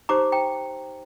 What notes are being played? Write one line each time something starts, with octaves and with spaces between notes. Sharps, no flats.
D#4 G4 C5 A#5 D6
G5 A#5